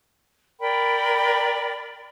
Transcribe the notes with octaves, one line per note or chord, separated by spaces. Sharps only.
A#4 D5 G5 B5